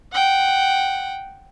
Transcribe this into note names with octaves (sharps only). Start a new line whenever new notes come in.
F#5 G5